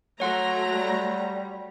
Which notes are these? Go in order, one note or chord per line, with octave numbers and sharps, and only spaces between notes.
F#3 A3 C#5 F#5 A#5 C6
G3